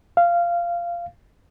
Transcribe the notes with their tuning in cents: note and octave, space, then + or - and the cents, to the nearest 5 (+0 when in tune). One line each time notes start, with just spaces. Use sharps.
F5 -15